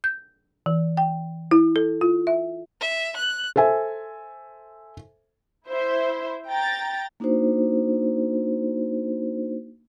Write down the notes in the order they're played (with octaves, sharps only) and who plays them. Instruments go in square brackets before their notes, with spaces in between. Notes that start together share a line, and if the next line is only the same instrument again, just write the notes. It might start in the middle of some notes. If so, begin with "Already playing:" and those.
[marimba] G6
E3
G5
E4
A4
F4
E5
[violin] E5
F#6
[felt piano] A4 C5 E5 G#5
[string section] E4 C5 E5
G5 A#5 A6
[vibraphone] A#3 D4 D#4 F#4 C5